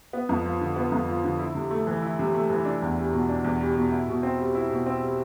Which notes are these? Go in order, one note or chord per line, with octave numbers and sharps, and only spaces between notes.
B3
F2
F3
D3
B3
F2
F3
D3
E4
C3
A3
E3
E4
C3
A3
E3
D4
E2
G3
B2
D4
E2
G3
B2
E4
B2
C4
G3
E4
B2
C4
G3